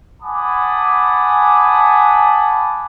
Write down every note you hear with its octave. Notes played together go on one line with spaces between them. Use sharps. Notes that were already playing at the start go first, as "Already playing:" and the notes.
F#5 G#5 A5 B5 D6 D#6